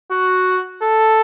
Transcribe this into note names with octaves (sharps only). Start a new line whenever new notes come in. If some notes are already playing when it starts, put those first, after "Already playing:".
F#4
A4